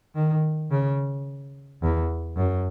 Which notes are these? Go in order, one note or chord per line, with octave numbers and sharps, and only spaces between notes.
D#3
C#3
E2
F#2